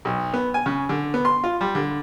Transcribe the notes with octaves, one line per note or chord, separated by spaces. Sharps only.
B1
B3
G#5
C#3
D3
B3
C6
F4
G3
D3